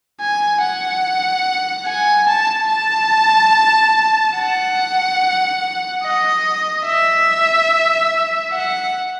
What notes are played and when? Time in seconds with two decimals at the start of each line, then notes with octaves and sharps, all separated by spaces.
0.21 G#5
0.62 F#5
1.87 G#5
2.29 A5
2.70 A5
4.38 F#5
6.04 D#5
6.86 E5
8.53 F#5